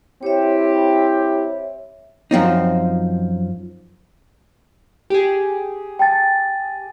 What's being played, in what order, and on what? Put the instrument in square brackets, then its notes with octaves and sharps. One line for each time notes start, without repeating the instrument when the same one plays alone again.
[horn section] C4 E4 G4 [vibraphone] C#5 E5
[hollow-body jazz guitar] F#2 F3 C4 D#4
[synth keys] G4 G#4
[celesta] G5 A5 A6